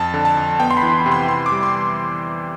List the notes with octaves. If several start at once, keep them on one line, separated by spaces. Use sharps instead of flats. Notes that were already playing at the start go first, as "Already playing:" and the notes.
Already playing: F2 A5
D3
A5
F2
B3 G5
C6
B5
E3
C3
C6
C3 C6
D6
G3
C6